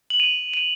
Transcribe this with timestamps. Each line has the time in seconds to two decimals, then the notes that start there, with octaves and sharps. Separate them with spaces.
0.10 F#7
0.20 D#7 F7
0.54 D#7